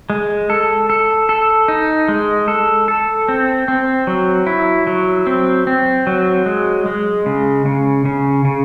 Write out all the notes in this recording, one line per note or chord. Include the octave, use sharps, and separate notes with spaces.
G#3
A4
A4
A4
D#4
G#3
A4
A4
C4
C4
F#3
E4
F#3
C4
C4
F#3
G#3
G#3
C#3
C#3
C#3
C#3